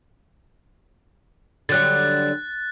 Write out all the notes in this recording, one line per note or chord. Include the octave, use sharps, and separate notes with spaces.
D3 F#3 G3 F#6 A6